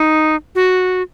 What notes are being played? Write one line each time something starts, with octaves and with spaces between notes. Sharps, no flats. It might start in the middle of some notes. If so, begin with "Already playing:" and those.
Already playing: D#4
F#4